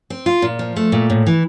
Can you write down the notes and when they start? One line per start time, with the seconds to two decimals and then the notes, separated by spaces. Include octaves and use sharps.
0.10 C4
0.26 F4
0.42 A#2
0.59 F3
0.76 A3
0.92 A#2
1.10 A2
1.27 E3